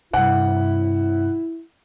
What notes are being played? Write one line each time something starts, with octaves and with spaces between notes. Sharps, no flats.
G2 C3 E4 F#5